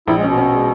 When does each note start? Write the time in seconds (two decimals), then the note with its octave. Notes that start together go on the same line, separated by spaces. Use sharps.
0.07 A#1 E4
0.17 G#3
0.23 B2 C#4
0.38 C#4
0.53 G#3